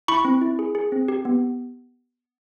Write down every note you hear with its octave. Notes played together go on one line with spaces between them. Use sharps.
E4 B5 C#6
C4
E4
G#4
G#4
C4
G4
B3